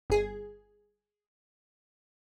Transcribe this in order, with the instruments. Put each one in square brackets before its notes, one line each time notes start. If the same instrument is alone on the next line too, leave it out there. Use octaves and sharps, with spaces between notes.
[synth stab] G1 G#4